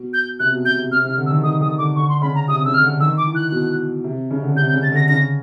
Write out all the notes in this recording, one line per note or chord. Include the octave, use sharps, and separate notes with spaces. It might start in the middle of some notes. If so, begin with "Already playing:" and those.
Already playing: B2
G6
C3 F#6
B2
C3 G6
C3
C3 F6
C3
F6
D3
E6
D#3
D#3 D#6
D#3 D#6
D3 D6
D3 C#6
C6
C#3 B5
A#5
C3 D#6
C#3 E6
F6
D3
D#3 E6
D6
E3
F#6
B2
C3
C#3
D3
C#3
C3 G6
G6
C#3
A6
D3 A#6
C#3 A#6